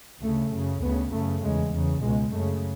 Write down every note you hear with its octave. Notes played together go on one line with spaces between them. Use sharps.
D2 C#3 A3
F#2 C#3
D2 C#3 B3
F#2 C#3 A3
E2 C#3 G#3
E2 C#3
C#2 B2 G#3
F#2 C#3 A3